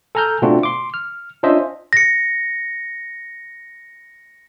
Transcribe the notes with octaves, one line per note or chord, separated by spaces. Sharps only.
A4 G#5 A#5 F6 G6
B2 A3 C4 D4 F4 F#4
C6 D6
F6
C#4 D4 F4 C5 D#5 E5
A#6 C#7